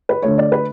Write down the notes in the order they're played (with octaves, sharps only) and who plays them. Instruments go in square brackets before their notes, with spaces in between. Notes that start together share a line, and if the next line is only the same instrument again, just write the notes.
[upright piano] B4
D3 A3 C#5
D5
B4